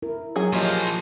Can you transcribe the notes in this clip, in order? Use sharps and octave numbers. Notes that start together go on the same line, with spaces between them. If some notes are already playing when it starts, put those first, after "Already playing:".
E4 A#4
F#3 G#4
F3 A#3 F4 G4 D#5